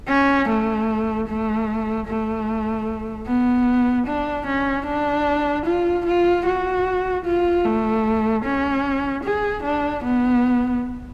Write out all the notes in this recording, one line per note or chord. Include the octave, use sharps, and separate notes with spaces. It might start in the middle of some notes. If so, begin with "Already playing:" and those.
C#4
A3
A3
A3
B3
D4
C#4
D4
F4
F4
F#4
F4
A3
C#4
G#4
D4
B3